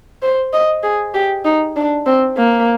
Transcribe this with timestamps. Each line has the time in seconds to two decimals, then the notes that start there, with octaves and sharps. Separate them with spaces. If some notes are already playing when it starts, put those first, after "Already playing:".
0.22 C5
0.53 D#5
0.84 G#4
1.14 G4
1.45 D#4
1.77 D4
2.06 C4
2.38 A#3